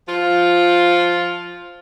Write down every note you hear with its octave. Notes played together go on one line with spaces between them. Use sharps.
F3 F4